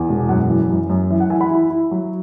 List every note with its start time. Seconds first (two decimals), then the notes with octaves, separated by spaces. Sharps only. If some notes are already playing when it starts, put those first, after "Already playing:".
Already playing: E2
0.09 E1
0.29 F#2 F#5
0.49 E3
0.70 F#2
0.90 F#2
1.10 E3 E5
1.20 F#5
1.30 E3 E5 G#5
1.41 F#5 B5
1.51 E4
1.70 E4
1.91 F#3